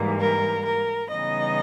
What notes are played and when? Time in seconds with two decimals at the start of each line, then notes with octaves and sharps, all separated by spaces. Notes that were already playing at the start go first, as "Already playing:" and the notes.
Already playing: G#2 E3 G3 A#3
0.20 A#4
0.66 A#4
1.11 C#3 E3 G3 B3 D#4 D#5